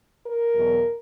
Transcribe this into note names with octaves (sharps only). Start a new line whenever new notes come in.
A#4
E2 B2 F#3